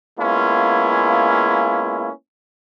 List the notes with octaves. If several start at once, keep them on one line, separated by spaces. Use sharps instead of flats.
G#3 A#3 B3 C#4 E4 F4